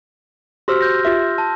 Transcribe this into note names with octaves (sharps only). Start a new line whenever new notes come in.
F#4 G4 C5 C6 E6 F6
G6 A#6
F4 G4 E5
A5